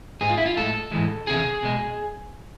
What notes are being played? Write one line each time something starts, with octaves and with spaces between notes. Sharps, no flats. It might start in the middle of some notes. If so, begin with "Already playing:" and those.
G#2 G#3 F4 G#4
E4
F4
A2 G#3 A4
G#2 E3 G#3
E2 C3 G#4
B2 G#3